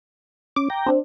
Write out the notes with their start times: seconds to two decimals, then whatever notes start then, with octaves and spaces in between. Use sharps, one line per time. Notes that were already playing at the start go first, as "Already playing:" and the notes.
0.56 C#4 D6
0.70 G5 A#5
0.86 C4 D4